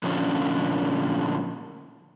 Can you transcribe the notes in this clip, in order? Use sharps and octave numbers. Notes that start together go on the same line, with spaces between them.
A#2 D3 F3 C#4